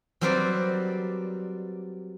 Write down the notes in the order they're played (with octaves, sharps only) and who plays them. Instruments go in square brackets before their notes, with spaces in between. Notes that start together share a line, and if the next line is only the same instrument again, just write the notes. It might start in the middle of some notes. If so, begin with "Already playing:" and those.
[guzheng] F#3 G3 C4 A#4 B4 D5